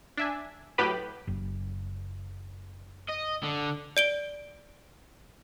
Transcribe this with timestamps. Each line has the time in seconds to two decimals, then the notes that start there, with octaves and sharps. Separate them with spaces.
0.17 D4 E5 G#5
0.78 A2 F#3 G4 B4 B5 D#7
1.27 F#1
3.09 D#5
3.43 D3
3.97 D5 D7 G7